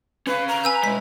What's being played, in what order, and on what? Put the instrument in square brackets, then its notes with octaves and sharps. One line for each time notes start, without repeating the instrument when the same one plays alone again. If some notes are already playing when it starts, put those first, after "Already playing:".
[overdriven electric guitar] C#4 F5 [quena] B4
[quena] A#5
[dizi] B4 [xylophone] G#5 E6 G6
[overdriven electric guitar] G#3 E4 [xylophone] B6